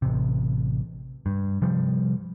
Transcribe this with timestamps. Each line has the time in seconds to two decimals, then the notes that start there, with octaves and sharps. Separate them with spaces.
0.02 A1 C3
1.26 G2
1.62 C3 F3 G3